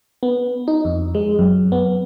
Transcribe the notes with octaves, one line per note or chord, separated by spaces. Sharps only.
B3
D#4
F2
G#3
F#2
B3